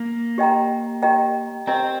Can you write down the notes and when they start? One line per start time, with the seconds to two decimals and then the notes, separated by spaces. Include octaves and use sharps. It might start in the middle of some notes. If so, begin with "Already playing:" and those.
Already playing: A#3
0.38 G4 D#5 G5 A#5
1.02 G4 D#5 G5 A#5
1.67 C4 G4 D#5 G5 A#5